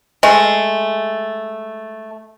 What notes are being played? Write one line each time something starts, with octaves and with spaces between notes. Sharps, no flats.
G#3 A3